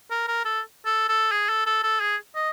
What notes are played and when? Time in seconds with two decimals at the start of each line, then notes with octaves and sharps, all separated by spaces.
0.11 A#4
0.28 A#4
0.45 A4
0.86 A4
1.09 A4
1.32 G#4
1.49 A4
1.66 A4
1.83 A4
2.01 G#4
2.35 D#5